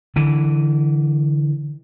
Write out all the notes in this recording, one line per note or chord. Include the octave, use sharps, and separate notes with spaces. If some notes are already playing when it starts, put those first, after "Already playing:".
D3 E3